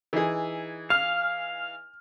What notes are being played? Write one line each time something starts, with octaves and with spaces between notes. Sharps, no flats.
E3 D#4 G#4
F5 F6